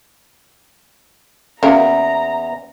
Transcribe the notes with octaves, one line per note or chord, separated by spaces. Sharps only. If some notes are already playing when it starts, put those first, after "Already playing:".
E2 A#3 C#4 F#4 A#4 A#5